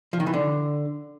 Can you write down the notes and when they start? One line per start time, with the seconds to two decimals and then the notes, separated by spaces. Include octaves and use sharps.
0.13 F3
0.20 D#3
0.27 E3
0.34 D3